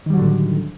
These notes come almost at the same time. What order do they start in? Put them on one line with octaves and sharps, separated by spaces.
D#3 G3 F#3 D3 A2